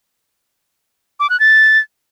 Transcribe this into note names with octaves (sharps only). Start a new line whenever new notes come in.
D6
F#6
A6